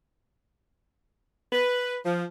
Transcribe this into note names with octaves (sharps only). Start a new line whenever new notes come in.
B4
F3